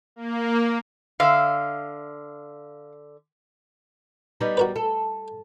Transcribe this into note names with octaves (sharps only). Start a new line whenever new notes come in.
A#3
D3 E5 F5
G3 B3 D#4
F#4 A#4 B4
A4